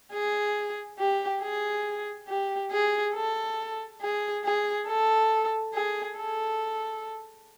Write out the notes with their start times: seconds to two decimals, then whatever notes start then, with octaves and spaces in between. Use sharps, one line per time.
0.13 G#4
0.99 G4
1.42 G#4
2.29 G4
2.72 G#4
3.15 A4
4.01 G#4
4.44 G#4
4.87 A4
5.74 G#4
6.17 A4